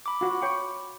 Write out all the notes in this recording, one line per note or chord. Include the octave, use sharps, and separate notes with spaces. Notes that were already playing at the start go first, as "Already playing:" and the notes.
B5 D6
F4 F#4
C#5 G5 C#6